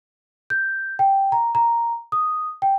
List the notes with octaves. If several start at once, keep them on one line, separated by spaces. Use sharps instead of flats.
G6
G5
A#5
A#5
D#6
G5